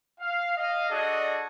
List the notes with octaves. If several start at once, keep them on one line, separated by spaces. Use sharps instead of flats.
F5
D#5 F5
D4 F#4 G#4 A4 D5 D#5